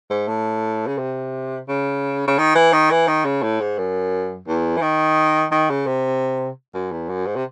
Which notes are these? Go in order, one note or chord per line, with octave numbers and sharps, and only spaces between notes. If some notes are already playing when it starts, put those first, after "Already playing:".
G#2
A2
C#3
C3
C#3
C#3
D#3
E3
D#3
E3
D#3
C#3
A2
G#2
F#2
E2
E3
D#3
D#3
C#3
C3
F#2
E2
F#2
G#2
C3